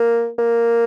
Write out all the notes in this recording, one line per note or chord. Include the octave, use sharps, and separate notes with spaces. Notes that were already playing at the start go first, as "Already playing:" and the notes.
Already playing: A#3
A#3